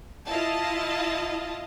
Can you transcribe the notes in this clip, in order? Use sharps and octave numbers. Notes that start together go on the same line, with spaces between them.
E4 F4 D#5 F5 A5